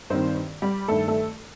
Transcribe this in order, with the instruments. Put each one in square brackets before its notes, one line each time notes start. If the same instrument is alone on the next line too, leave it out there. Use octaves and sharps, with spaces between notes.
[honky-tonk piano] G2 D#3 C4 C5
G3 G4
G2 D#3 A3 A4
A3 A4